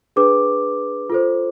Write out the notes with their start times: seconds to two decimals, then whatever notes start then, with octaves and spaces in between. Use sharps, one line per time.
0.16 D4 G#4 B4 D6
1.10 F4 A4 C5